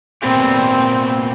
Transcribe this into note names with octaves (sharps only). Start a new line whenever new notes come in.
A#2 B3 C4 G4